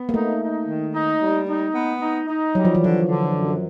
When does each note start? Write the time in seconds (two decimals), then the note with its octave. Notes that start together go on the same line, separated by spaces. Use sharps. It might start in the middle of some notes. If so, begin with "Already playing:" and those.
Already playing: B3
0.09 A#3
0.14 A3 D#4
0.41 D#4
0.67 D#3
0.94 D#4
1.21 G3
1.47 D#4
1.74 B3
2.01 D#4
2.28 D#4
2.55 F#3 G3
2.65 F3
2.75 E3
2.82 D3 F3
3.08 D3
3.35 F#2